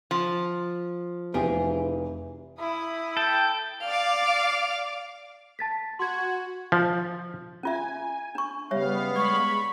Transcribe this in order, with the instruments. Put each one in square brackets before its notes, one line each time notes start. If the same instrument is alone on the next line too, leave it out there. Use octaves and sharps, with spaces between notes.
[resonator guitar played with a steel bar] F3
[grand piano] F1 [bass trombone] E3 [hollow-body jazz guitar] F4 G4 G#4
[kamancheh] E4 D#6
[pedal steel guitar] A4 [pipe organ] G5 G6
[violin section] D5 F5 D6
[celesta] A5 A6 B6
[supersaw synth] F#4 [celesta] C6 G#6
[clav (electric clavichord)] F3
[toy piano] C#4 F4 E5 [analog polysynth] G#5
[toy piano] D4 C#6
[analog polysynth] C#3 G3 [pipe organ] B3 F5 [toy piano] C#5 E5
[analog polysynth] G#3 B5 [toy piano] D5 [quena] C#6